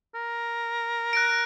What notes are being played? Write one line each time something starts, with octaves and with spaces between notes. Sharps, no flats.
A#4
F#6 A#6 D7